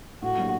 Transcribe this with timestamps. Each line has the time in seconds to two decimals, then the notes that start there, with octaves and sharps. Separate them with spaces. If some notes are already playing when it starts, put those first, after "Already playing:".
0.22 A2 F#4
0.38 F#3 A#3 D4 G4